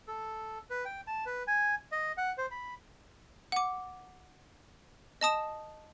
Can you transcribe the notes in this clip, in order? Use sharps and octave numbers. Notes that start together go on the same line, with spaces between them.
A4
B4
G5
A5
B4
G#5
D#5
F#5
C5
B5
F#5 D6
D#5 A5 D#6 E7